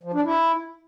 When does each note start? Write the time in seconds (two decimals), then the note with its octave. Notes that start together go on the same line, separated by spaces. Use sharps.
0.03 F3
0.14 D4
0.25 E4